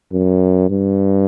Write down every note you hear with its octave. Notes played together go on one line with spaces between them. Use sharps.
F#2
G2